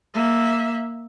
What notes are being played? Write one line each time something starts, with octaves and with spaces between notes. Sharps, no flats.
A#3 E5